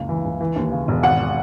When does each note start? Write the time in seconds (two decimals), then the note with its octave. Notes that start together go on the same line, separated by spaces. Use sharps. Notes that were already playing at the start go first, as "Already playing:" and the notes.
Already playing: F#1 C#2 C#3
0.09 E3
0.25 C#2
0.41 E3
0.56 D#2
0.72 C#3
0.88 E1
1.03 G#1 F#5